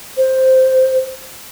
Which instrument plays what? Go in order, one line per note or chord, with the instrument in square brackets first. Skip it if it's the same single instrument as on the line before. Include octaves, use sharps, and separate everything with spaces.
[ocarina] C5